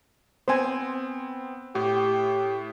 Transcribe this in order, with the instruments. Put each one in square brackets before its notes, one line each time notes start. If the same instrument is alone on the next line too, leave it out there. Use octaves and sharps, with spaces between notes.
[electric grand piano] B3 C4 [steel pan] C5 G#5
[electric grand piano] A2 [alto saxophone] G4